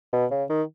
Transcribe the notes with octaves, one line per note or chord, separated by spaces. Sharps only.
B2
C#3
D#3